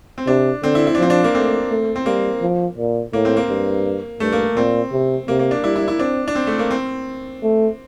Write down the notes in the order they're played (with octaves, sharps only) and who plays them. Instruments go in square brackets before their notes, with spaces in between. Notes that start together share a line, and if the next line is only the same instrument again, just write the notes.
[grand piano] C4
[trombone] C3 [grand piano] D4
[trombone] D3 [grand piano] C4
[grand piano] E4
E4
D4
[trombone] F3 [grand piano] C4
[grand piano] D4
A#3
[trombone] A3 [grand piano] C4
[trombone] A3
[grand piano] C4
[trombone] G3 [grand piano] A#3
[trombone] F3
A#2
[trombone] A2 [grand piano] A#3
[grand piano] C4
A#3
[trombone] G2
[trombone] G2 [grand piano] A3
[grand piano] A#3
[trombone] A#2 [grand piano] C4
[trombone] C3
[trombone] C3 [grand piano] A#3
[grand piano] A#3
D4
[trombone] G3 [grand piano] E4
[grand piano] E4
E4
[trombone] C4 [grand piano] D4
[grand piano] D4
C4
A3
A#3
C4
[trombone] A3